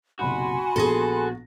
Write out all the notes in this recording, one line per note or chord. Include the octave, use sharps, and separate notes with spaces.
F#1 B1 C3 F#4 G#5 B5 C6
A#1 B3 G#4 A4 A#6